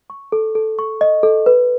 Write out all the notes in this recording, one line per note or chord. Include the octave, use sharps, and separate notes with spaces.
C#6
A4
A4
C#6
D#5
A4
B4